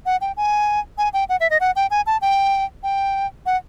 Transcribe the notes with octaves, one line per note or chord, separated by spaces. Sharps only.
F#5
G5
G#5
G#5
G5
F#5
E5
D#5
F#5
G5
G#5
A5
G5
G5
F#5